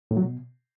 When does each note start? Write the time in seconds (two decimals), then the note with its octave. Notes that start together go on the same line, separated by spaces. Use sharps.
0.11 A2
0.17 F#3
0.23 B2